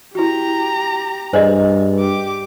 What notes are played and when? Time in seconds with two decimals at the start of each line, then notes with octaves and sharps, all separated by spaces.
0.15 E4 F#4 G4 A#5
1.33 G2 G#4 C5 D5 D#5 G#5
1.98 G4 D6